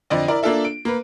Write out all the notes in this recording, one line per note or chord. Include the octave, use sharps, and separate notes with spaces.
F2 D3 D5 D#5
E4 A#4 D5
A#3 D4 F4 A4 E5
D7
A#3 B4